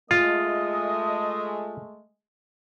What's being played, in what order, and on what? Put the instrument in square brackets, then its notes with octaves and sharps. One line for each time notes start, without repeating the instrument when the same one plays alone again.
[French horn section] G#3 A3 [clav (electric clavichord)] F4 [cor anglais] D#5